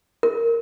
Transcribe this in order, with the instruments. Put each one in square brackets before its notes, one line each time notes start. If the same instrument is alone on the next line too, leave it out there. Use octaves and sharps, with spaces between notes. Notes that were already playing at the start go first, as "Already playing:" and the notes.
[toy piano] A#4